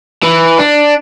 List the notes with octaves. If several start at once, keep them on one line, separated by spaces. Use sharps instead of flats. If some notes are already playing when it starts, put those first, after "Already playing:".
E3
D4